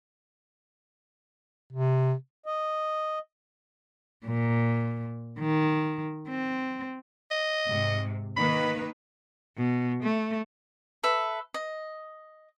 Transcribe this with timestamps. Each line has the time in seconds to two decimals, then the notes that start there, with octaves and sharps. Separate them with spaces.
1.72 C3
2.46 D#5
4.26 A#2
5.39 D#3
6.28 C4
7.31 D#5
7.66 G#2 C3
8.37 D#3 A#3 B4 B5
9.57 B2
10.03 A3
11.03 A4 B4 E5
11.54 D#5